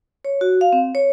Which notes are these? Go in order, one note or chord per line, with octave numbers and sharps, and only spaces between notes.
C#5
F#4
F5
C4
C#5